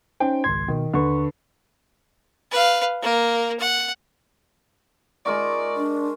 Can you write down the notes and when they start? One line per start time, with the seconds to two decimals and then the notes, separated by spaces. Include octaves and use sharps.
0.20 C#4 D#4 C5 G5
0.44 G#1 C#2 C6 G#6
0.68 B2 D#3
0.94 D#2 D3 B4 C#6
2.51 B4 F5
3.02 A#3 A#4
3.59 F#5
5.26 G#3 D#4 F4 A#4 D5 C#6
5.76 D4